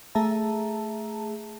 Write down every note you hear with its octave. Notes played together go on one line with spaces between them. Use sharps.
A3 G#4 E5 A5 A#5